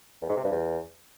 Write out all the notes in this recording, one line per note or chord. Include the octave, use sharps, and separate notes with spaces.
E2
G#2
C3
G2
E2